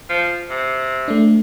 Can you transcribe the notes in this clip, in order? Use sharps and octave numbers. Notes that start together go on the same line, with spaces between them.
F3
C3
A3 D4